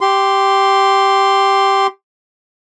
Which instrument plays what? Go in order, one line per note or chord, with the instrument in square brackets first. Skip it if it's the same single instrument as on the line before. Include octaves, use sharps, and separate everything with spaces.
[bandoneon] G4 C6